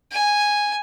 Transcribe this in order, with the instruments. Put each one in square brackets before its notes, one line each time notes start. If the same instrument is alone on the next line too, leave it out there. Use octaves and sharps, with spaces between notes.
[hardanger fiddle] G#5